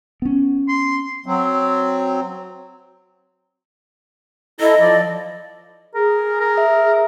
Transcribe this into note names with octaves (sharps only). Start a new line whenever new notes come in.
B3 C#4
C6
F#3 C4
E4 A4 D#5 A#5
F3 D5
G#4 A#4
A#4
E5